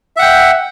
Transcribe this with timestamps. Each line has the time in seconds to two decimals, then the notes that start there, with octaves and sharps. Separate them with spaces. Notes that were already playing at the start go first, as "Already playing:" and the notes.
0.17 E5
0.19 F#5
0.22 G5